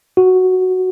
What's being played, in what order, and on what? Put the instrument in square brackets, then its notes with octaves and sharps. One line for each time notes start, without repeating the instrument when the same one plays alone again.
[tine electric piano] F#4